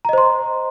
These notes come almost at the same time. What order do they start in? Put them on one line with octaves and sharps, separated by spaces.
A#5 D#5 C5 C6